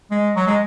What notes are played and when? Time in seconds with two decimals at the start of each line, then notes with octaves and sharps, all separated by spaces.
0.11 G#3
0.36 F#3
0.47 G#3